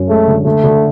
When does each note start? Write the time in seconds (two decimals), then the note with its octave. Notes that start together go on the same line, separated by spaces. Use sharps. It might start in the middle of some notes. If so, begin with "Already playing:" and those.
Already playing: F#2 C#4
0.09 G#3 A3
0.27 D3
0.45 D3 A3
0.64 D3